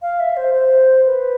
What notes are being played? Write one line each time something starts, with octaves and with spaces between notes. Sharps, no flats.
F5
E5
C5
C5
B4